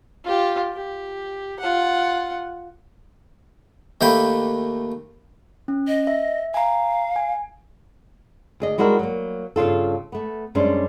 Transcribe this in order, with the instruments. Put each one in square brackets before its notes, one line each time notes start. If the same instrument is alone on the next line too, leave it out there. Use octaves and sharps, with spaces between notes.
[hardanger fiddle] F4 G4
G4
F4 F#5
[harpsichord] D#2 A3 A#3 C5 G5 B5
[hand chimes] C#4
[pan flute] D#5
[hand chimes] E5
[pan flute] F5 [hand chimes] G#5 A#5
[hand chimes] G#5
[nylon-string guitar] D2 G#4 D#5
G3 G#3 E4 F#4 A4 A#4
F#3 A#3
G2 C#3 F4 A4
A3 B3
F#2 G3 G#3 C#4 D4 C5